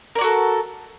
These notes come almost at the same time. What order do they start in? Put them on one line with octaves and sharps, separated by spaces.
A#4 D5 F#4 A4